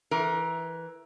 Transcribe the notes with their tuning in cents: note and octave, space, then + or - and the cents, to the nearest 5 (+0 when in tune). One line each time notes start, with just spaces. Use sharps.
E3 +0 A#4 +25